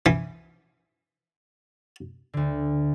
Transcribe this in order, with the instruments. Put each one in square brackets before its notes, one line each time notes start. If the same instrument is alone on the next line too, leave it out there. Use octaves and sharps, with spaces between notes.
[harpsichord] E3
[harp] D2 D3